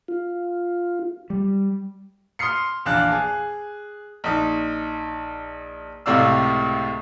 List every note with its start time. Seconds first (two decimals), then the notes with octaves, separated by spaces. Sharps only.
0.08 F4
1.30 G3
2.39 C6 D#6 F6 C7 C#7
2.86 A#1 E2 D4 F5 A5 F#6
3.12 G#4
4.24 A#1 D#4
6.06 C#2 A2 C3 D5 F5 E6